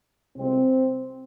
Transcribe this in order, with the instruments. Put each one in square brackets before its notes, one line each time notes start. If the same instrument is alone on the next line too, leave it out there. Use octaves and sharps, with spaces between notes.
[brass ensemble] C2 C3 F3 G#3 C4